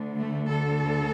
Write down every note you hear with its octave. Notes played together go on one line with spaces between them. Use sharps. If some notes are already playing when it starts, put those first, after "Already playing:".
Already playing: D2 D3
A3
A4